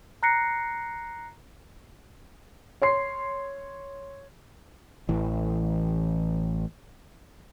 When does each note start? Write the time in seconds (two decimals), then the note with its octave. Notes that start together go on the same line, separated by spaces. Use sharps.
0.23 A#5 F#6 A#6 C7 C#7
2.82 C#5 C6 C7
5.09 A1 E3